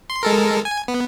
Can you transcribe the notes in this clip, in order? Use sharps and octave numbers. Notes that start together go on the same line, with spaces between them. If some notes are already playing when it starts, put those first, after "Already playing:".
C6
G#3 A4 A#4
G#5
B3